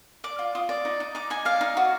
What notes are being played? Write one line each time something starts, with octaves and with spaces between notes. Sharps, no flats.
D5 D6
F4
F4 D#6
D5
D#4
D#4
D#4 D6
D#4 G#5
D5 F5
D#4
F#4